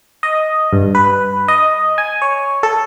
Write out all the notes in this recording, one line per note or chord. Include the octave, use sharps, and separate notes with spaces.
D#5
G2
B4
D#5
G#5
C#5
A4